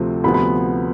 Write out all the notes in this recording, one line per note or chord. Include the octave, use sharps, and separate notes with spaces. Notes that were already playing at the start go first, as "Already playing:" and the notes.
Already playing: D2 C3 F3 A3 C4
D2 C3 F3 B3 B5
B5